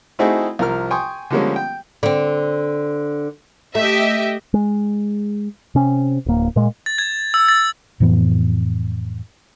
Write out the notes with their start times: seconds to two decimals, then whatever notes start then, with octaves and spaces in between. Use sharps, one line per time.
0.19 A3 C4 D#4 E4 F#4 G#4
0.59 C2 F3 A#4 F6
0.91 G5 G#5 C6 C#6 D#6
1.30 D3 F3 G3 G#3 A#3 C#4
1.56 G5
2.03 D3 C4
3.75 A3 G4 D#5 E5
4.54 G#3
5.75 C3 C#4
6.26 D1 A#3
6.56 A#2 G#3
6.86 A6
6.98 G#6
7.34 E6
7.48 A6
8.00 F2 A2 E3 B3